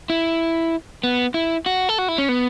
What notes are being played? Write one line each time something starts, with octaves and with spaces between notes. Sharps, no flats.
E4
B3
E4
F#4
A4
F#4
E4
C#4
B3